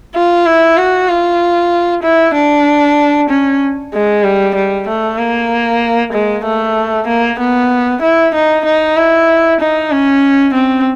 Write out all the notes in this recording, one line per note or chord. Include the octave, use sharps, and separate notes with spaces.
F4
E4
F#4
F4
E4
D4
C#4
G#3
G3
G3
A3
A#3
G#3
A3
A#3
B3
E4
D#4
D#4
E4
D#4
C#4
C4